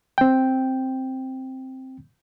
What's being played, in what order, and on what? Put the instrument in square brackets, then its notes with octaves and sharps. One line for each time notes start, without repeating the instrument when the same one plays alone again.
[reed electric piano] C4 G5